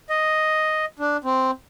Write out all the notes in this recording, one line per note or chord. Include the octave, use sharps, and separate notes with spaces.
D#5
D4
C4